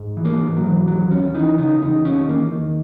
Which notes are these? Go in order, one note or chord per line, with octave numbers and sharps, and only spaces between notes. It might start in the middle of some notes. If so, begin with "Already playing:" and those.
Already playing: G#2
E3
A#3
G#2
F#3
E3
D#2 F#3
D#2 C#4
E3 D#4
C#3 D#4
E2 D#4
D#3 C#4
E2 A#3
D#3